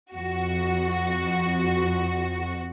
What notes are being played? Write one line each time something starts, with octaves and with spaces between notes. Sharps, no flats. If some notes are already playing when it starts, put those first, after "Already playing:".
F2 F#4